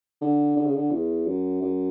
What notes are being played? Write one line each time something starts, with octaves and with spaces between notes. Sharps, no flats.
D3
D3
C#3
D3
E2
F#2
F#2